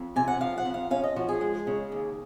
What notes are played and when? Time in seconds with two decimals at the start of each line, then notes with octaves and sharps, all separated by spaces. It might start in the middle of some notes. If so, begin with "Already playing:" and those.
Already playing: F2
0.16 C3 G#5
0.28 F#5
0.41 F3 F5
0.58 F#5
0.65 F2
0.74 F5
0.91 C#4 F5
1.03 D#5
1.16 F3 F#4
1.29 G#4
1.41 G#3
1.67 C#3
1.92 D#2